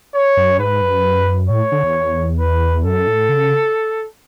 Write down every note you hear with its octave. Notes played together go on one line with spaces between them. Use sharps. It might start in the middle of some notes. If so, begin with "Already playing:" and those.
C#5
F#2
G#2 B4
F#2
A2 C#5
D3
E2
B4
F#2 A4
A2
C#3